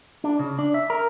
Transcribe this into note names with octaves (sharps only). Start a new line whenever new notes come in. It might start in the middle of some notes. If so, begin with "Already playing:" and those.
D4
C#3
D4
E5
A#4